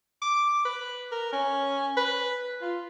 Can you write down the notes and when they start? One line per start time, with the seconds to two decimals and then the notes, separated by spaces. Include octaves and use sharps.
0.22 D6
0.65 B4
1.12 A#4
1.32 C#4
1.97 B4
2.62 F4